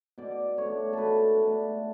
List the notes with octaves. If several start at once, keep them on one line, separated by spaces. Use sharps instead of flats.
B2 D5
A3 D4 C#5
B2 A4 B4
A3 D4